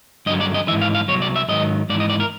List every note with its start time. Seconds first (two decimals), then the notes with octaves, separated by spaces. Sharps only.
0.26 G2 D3 F#3 D#5
0.41 D5
0.54 D#5
0.68 E3 E5
0.71 G#2
0.82 F5
0.95 F5
1.08 C2 A#2 F#3 C#5
1.22 D5
1.36 E5
1.48 G#2 D#3 F#3 D#5
1.90 G#2 D5
1.94 E3
2.00 D#5
2.10 D5
2.20 A#4